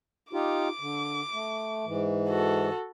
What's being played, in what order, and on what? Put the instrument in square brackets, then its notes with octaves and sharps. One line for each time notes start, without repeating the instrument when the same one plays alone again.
[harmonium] D#4 F4 G4 [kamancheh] D6
[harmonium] D3
A3
G#2 E3
[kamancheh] F#4 A4